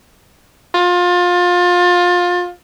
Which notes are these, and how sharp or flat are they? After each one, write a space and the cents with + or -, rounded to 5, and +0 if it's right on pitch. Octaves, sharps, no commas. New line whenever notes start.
F4 +25